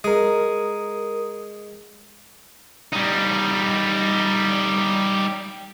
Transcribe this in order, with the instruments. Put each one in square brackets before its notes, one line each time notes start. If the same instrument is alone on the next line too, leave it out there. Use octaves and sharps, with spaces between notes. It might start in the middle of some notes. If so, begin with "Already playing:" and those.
[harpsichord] G#3 [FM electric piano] A#4 D#6
[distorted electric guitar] G3 D#4